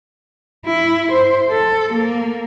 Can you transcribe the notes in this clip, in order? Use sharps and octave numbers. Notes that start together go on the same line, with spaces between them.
E4
C5
A4
A#3